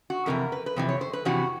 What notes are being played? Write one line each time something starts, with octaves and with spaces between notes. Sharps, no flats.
F#4
F2 C3 E3 A#4
B4
B4
F2 C3 E3 C5
C#5
C5
B4
F2 C3 E3 F#4